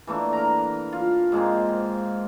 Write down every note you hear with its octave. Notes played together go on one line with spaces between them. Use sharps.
E3 A3 A#3 D4
A#4 A#5
F4
G#2 G#3 A#3 C4